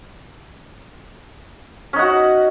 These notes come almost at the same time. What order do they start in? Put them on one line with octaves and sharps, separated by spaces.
C#4 D#4 F#5 F#4